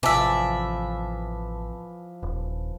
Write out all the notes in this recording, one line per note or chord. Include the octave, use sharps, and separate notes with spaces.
A1 C3 E3 F3 D5 E5 A5
D#1